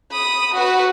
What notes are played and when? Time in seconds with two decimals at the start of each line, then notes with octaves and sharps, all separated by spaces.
0.11 B5 D#6
0.53 F#4 B4